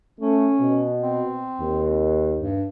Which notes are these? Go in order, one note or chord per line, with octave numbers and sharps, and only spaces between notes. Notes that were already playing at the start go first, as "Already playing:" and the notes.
A3 C#4
B2
C4
D#2
G2